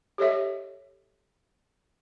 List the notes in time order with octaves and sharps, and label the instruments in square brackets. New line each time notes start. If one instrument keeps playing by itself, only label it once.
[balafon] G4 A4 C#5 D#5 E5